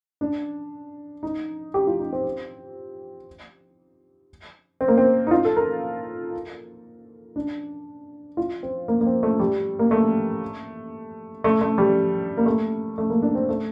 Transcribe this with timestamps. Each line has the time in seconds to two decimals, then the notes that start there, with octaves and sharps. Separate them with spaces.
0.21 D4
1.23 D#4
1.74 G4
1.87 F4
1.99 D#4
2.13 C4
4.81 C4
4.88 A#3
4.98 C4
5.27 D#4
5.31 F4
5.45 A4
5.56 A#4
7.36 D4
8.37 F4
8.63 C4
8.88 A#3
9.01 A#3
9.06 C4
9.23 A3
9.39 G3
9.79 A#3
9.91 A3
11.44 A3
11.61 A3
11.78 G3
12.37 A#3
12.46 A3
12.98 A3
13.10 A#3
13.22 D4
13.35 C4
13.49 A3